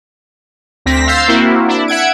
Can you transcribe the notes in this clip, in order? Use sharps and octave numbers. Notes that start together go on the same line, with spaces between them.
D2 C4 A#6 B6
F5 C6 E6 G6 A6 C7
A#3 C4 E4 F#4
D4 E4
E5 F#5 G#6 D7